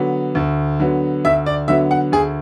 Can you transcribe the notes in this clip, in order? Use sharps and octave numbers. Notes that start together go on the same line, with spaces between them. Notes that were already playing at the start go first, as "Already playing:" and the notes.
Already playing: D3 F#3 B3
D2
D3 F#3 B3
D2 E5
D5
D3 F#3 B3 E5
F#5
D2 G#4